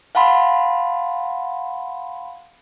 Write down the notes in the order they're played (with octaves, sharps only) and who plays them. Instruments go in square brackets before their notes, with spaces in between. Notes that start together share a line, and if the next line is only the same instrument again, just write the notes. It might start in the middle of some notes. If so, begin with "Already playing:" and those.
[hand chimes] F5 F#5 A5 B5 C6